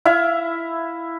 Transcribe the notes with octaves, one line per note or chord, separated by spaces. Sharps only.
E4 E5 F5